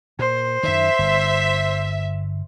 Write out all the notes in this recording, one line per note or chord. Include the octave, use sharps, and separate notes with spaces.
A#2 C5
F#2 D#3 E5
G1